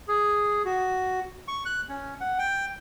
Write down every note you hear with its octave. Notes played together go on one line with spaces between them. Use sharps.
G#4
F#4
C#6
F#6
C#4
F#5
G5